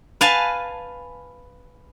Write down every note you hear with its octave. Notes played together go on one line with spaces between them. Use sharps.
B4 F5 G#5 A5